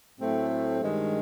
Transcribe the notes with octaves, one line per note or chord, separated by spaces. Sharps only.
A2 F#3 A3 C4
G2 D#3 G#3